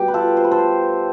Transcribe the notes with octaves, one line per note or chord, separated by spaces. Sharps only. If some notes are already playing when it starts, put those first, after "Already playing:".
Already playing: B2 G3 G4
B4
F4 A4
C5
B4
A4 C5